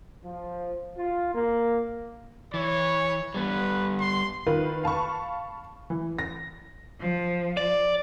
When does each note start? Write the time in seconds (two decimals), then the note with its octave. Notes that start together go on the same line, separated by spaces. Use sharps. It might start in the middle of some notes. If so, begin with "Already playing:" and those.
0.25 F3
0.97 F4
1.35 A#3
2.54 E3 C#5
3.35 G3 B3 B4
4.00 C6
4.46 D#3 F4 B4
4.83 F5 A5 B5 C#6
5.90 E3
6.19 A#6
7.00 F3
7.57 D5